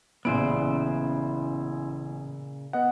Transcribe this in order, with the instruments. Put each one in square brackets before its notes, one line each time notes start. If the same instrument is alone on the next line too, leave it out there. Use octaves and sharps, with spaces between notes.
[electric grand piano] A1 D7 [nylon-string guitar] A#2 C#3 [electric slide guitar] B3 E4 C5
[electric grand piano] B3 D#5 F#5